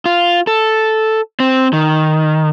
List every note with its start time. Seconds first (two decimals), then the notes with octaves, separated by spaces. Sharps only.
0.06 F4
0.47 A4
1.40 C4
1.73 D#3